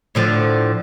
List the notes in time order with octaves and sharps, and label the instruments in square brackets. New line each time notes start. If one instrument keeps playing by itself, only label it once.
[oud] A2 D3 F3